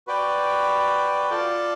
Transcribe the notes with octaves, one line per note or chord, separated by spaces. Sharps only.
F#4 B4 D5 G5
F4 A4 D5